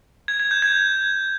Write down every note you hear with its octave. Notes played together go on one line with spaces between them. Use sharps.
G#6
G#6
G6
G#6